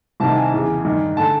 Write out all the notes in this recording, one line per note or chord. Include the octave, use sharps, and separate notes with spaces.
C2 C3 D#3 A5
G#5
E2 C#3 E3
G2 D#3
D3 A5